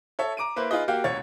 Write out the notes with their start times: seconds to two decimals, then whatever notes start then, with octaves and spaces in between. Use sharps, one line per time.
0.19 A4 C#5 E5
0.37 A#5 D6 D7 D#7
0.56 A#3 E4 B4 C5
0.71 D#4 F4 G#4 B4 D#5
0.88 A#3 F#4 G4 F5 G5
1.04 E1 C#2 C#5 A6